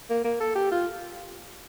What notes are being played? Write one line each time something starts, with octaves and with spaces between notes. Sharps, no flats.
A#3
A#3
A4
G4
F4